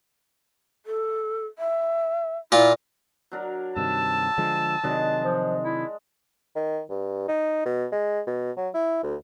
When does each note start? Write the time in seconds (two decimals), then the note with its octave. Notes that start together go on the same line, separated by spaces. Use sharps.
0.86 A4
1.58 E5
2.52 A#2 E4 F4
3.32 F#3 D4 A#4
3.76 G2 C3 D#3 A5 E6
4.38 D3 F3 G#3
4.84 C3 D#3 F#3 G#3 D4 D#5
5.20 F3
5.62 E4
6.56 D#3
6.90 G2
7.28 D#4
7.65 B2
7.92 G#3
8.27 B2
8.57 F#3
8.74 E4
9.03 D2